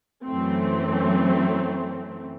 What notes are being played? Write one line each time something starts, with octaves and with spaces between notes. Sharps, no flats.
F#2 E3 F#3 A3 C4